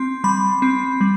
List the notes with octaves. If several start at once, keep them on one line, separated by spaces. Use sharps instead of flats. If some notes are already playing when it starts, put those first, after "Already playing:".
Already playing: C4 C6
G3 B5
C4
G3